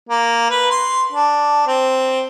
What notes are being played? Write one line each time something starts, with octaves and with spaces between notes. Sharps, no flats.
A#3
B4
C6
D4
C4